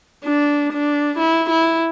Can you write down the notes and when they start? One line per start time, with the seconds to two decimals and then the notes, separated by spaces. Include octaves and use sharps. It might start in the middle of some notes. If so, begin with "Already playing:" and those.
0.25 D4
0.72 D4
1.18 E4
1.50 E4